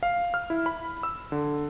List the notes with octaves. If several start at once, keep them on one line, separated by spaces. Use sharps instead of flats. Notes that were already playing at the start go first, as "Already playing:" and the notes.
F5
F6
E4
B5
E6
D3